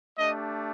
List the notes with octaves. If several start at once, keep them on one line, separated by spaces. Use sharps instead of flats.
A3 D4 G4 D#5